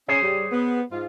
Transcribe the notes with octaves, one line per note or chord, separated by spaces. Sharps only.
C#4 G#4 C5 C#5
G3
B3
G#2 F4